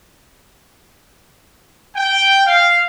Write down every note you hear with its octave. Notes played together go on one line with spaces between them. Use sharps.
G5
F5